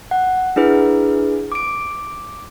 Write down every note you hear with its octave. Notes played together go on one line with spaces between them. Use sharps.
F#5
D4 E4 G#4 B4
D6 D7